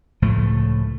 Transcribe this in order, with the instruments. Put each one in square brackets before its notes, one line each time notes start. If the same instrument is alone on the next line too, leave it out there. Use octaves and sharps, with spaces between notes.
[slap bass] C#2 A2 F3 A3